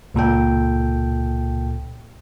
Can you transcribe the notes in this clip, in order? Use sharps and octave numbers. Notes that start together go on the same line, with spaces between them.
C#2 A#2 A4 G5